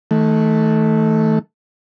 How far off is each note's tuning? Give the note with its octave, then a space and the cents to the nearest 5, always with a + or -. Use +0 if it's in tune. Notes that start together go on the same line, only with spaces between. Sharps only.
D#3 +40 A3 +0